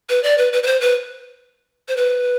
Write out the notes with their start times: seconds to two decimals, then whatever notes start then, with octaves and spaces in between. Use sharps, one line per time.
0.09 B4
0.23 D5
0.38 B4
0.53 B4
0.63 B4
0.66 C5
0.81 B4
1.88 C5
1.97 B4